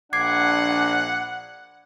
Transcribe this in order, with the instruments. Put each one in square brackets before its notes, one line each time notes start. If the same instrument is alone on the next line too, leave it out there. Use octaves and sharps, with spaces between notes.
[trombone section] A#1 D4 [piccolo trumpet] F#5 [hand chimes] D6 G#6 C7